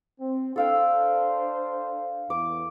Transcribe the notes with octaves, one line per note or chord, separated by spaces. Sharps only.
C4
D4 A4 C5 F5 G5
E2 D6